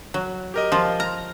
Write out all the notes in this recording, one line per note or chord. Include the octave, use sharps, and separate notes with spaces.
F#3
G4 A#4 D#5
F3 F4
A#5 F6